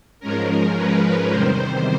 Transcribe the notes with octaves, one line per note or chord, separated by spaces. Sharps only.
G#2 F3 G#3 C#4 A#4
B4
E2 C3 D#3 G3 C5